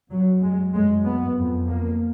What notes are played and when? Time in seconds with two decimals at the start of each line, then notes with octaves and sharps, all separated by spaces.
0.11 F#2 F#3
0.42 G#3
0.73 F#2 G#3
1.05 B3
1.37 F2
1.68 A#3